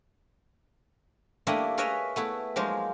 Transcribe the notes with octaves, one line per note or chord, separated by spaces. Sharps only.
G3 A3 A#3 D4 E4 D#5
G#4 A#4 B4 C#5 D#5 E5
A3 B3 E4
F3 F#3 G#3 A#3 D#4